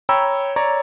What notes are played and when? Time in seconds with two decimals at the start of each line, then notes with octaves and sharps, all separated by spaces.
0.09 C#5 G5 A#5 B5 E6
0.56 C#5 D5 A#5